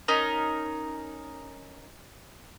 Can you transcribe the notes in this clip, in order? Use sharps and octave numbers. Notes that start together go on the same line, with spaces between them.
C#4 D#4 A#4